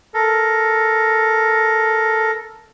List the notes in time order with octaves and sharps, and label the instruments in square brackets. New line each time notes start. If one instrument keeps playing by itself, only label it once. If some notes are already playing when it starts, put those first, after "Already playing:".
[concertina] A4 A#4